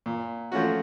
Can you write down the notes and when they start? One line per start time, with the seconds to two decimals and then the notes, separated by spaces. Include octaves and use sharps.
0.06 A#2
0.52 F3 A3 C#4 F#4